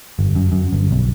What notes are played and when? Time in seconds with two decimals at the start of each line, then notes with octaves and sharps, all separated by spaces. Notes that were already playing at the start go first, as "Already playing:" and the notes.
0.19 G1
0.35 F#2
0.52 F#2
0.73 G1
0.91 B1